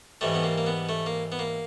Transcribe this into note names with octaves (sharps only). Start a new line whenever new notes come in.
G#2 E3 G3 A3
B3
A#3
A#3
B3
A3
A#3
B3
A#3